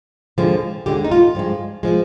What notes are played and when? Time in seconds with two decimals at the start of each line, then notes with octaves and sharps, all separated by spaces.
0.38 D#2 D3 F3 G#3
0.86 D#2 D3 G#3 G4
1.04 D#4
1.11 F4
1.35 G2 F3 G#3
1.83 F3 G#3